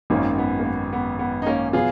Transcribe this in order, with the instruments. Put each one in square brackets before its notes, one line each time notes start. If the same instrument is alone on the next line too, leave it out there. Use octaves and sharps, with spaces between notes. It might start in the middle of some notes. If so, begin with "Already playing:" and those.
[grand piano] G#1 F#2 D#3 [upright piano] A#3 C#4
[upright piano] B3
A#3
B3
B3
B3
D#4
A#3 C#4
[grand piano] B2 F#3 B3 [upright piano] F4 G#4